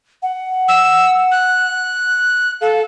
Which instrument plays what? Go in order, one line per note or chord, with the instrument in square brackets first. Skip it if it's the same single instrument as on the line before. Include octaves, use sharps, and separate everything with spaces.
[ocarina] F#5
[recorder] E6
F#6
[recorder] A4 [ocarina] F5